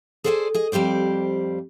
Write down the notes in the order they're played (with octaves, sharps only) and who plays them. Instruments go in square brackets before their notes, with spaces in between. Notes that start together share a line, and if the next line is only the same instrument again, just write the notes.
[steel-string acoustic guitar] G#4 A4 C5 D5 F5 G#5
G#4 D#5
F2 G3 G4 C5 D5